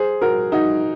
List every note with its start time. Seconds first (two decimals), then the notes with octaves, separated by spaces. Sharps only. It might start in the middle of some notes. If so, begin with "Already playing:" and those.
Already playing: G#4 C5
0.21 F#4 A#4
0.52 D#4 F#4